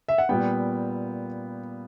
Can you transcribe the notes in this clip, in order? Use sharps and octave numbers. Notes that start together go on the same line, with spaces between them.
E5
F#5
A#2 G3 B3 G5